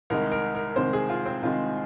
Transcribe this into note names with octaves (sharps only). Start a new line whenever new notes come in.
C2 C3 D#3 G#3 A#4
A#4
A#4
C2 C3 D#3 G#3 C5
G#4
F4
C4
C2 C3 D#3 G#3 F4